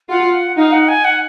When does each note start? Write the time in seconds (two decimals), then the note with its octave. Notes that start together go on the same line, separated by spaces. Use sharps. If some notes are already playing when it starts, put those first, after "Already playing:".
0.09 F4 F#5
0.57 D#4 F5
0.72 F#5
0.88 G#5
1.04 F#5